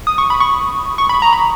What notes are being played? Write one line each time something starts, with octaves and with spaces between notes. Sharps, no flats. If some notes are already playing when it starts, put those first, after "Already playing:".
D#6
C#6
B5
C#6
C#6
B5
A#5
B5